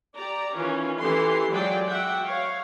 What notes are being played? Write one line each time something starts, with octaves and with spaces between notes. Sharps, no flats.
G4 D5 A#5
D#3 E3 C#4 F4
E3 G4 A4 C6
F#3 G#3 F4 D5 G5
F#4 E5 F#5 G5
C#5 F5